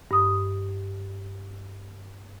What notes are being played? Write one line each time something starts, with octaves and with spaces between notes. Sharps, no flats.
G2 D#6